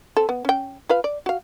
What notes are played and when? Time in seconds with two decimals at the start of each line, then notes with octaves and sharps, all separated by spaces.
0.17 C4 A4
0.29 B3
0.45 C#4 G5
0.89 F4 B4 F5
1.04 D5
1.26 F#4 F5